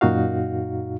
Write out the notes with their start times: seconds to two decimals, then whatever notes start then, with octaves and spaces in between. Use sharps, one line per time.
0.01 F#2 A#2 D#4 F#4 F5